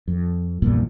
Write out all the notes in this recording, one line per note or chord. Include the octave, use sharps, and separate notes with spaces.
F2
A#1 E2 G2 A#2